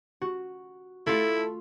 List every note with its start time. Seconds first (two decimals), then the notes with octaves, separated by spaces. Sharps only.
0.21 F#4
1.07 A3 E4 F4 A4